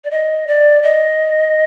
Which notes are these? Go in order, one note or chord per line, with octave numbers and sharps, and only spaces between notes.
D5
D#5
D5
D#5